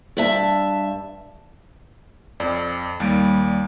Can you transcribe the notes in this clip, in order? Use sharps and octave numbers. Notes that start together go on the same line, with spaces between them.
G2 E5 A5
F2 D5
D#2 G3 D7